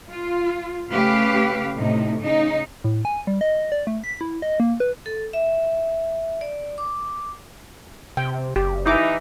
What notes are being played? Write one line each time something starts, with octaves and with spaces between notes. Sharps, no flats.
F4
C#3 A3 C#4 G4 B4 F5
A2 C3 D#4
C#3 D#4
A2
G#5
G3
D#5
D5
A3
B6
E4
D#5
A#3
B4
A4
E5
D5
D6
C3 G5
F#1 G4
E3 D#4 E4 D6